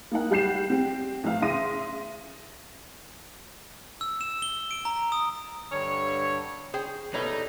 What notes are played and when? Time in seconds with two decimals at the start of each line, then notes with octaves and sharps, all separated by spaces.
0.11 A#3 D#4 F#5
0.31 G3 F#5 G6 C7 E7
0.70 C4 G4
1.24 A1 F3 F5
1.42 C#3 E5 C6 D#6 A#6 D#7
4.01 E6
4.21 E7
4.42 G7
4.71 D7
4.85 A#5
5.12 D#6
5.72 G2 D3 C#5
6.74 G#4 C5 G5
7.14 B2 G3 D#4 E4 A4 B4 C#5